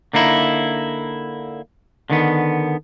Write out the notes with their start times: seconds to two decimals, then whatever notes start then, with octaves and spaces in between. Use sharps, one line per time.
0.14 D3 A#3 D#4 E4
2.10 D3 D#3 B3